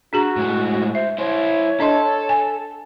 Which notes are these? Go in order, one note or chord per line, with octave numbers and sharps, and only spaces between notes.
D4 F#4 G#4 A#5
A2 G#3
C5 E5
E4 C5 C#5
D4 A4 D#5 C6
G#5